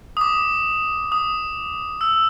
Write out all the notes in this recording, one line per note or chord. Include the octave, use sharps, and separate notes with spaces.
D#6
D6
D#6
E6